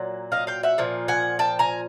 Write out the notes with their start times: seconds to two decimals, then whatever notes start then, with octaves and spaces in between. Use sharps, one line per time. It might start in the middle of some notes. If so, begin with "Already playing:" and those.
Already playing: A#2 F#3
0.32 D#5 F5
0.47 F5 G5
0.63 E5 F#5
0.78 A#2 F3
1.08 F#5 G#5
1.39 G5 A5
1.59 G#5 A#5